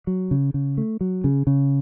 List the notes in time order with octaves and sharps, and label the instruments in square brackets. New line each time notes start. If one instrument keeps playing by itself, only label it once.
[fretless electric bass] F#3
C#3
C#3
A3
F#3
C#3
C#3